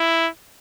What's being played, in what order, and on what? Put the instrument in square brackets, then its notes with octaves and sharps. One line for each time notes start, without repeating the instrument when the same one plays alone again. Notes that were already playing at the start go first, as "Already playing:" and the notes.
Already playing: [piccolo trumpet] E4